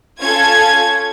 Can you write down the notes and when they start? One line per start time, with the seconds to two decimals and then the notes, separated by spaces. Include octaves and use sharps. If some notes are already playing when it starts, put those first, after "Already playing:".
0.21 C#4 F4 A4 G#6